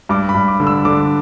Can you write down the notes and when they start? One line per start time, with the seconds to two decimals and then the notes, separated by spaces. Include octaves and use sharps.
0.09 G2 D6
0.29 B5
0.34 G2
0.48 D6
0.60 D3
0.67 E6
0.85 D3 D6